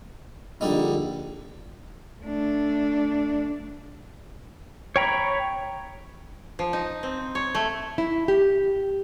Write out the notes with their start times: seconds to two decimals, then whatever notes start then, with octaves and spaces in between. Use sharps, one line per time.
0.61 A#1 D3 G3 D#4
2.22 A3 D4
4.96 C#5 G5 A#5 B5
6.59 F3
6.73 D#4
7.03 C4
7.35 C#5
7.55 A3
7.98 E4
8.28 G4